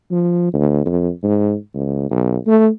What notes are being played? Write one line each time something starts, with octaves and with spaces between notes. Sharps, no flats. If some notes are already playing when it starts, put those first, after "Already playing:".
F3
D2
F2
G#2
C#2
B1
A3